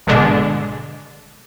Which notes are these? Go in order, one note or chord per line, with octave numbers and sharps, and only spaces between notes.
G#1 B2 D3 G#3 D4